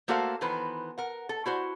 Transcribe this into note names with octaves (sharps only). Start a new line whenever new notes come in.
A3 A#3 F#4 A4 C5 F5
D#3 E3 B3 B4 C5
A#4 F#5
A4
E4 F#4 C5